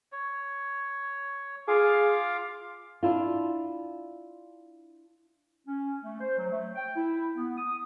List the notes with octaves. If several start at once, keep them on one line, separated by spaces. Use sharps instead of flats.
C#5
F4 G#4 F5 D6
D4 E4 F4
C#4
A3
C5
F#3
A3
G5
E4
B3
D#6